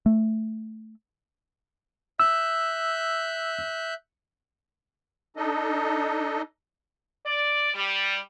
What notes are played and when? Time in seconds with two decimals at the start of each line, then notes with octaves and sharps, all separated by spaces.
0.06 A3
2.20 E5 E6 F#6 G6
5.37 D4 D#4 A4 D#5
7.26 D5
7.74 G3